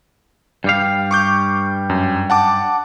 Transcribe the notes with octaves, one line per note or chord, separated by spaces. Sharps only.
G2 G3 F5
C#6 D6 G6
F#2
F#5 A5 D6